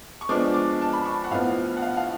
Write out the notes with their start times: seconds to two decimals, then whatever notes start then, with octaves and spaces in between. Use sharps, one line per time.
0.21 C#6
0.29 F3 G#3 B3 D4 D6
0.54 D6
0.81 A5
0.93 B5
1.05 C#6
1.24 F#5
1.31 A2 F3 B3 F5
1.77 F#5
1.82 F5
1.97 F5